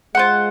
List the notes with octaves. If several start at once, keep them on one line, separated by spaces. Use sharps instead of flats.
G#3 F4 C5 F#5